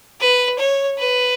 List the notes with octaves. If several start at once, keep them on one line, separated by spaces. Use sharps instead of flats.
B4
C#5
B4